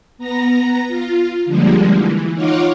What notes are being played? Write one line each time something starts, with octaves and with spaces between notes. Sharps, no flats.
B3 A#5 A#6
F4
D3 F3 G3 G#3 A#3
E3
D#4 F4 C#5 F5 F#5 D6